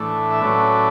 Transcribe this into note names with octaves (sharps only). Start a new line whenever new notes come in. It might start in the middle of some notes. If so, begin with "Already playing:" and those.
Already playing: A2 E3 A3 D4
E5
A2 F#3 A3 C#4 B4 D5